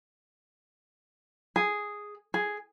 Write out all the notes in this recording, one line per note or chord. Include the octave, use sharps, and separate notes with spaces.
G#4
G#4